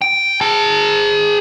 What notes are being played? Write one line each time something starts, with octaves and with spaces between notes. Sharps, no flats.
G5
G#4 A5